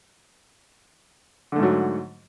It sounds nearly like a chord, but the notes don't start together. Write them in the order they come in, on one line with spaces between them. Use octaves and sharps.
D3 A3 G#2 F#3